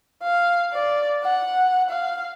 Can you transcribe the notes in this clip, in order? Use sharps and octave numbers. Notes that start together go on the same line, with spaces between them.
F5
D5
F#5
F5